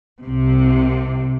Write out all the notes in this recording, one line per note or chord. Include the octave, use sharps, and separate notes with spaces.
C2 C3